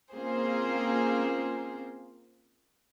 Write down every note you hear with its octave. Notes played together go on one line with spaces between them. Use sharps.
A#3 C4 C#4 F4 G#4 C5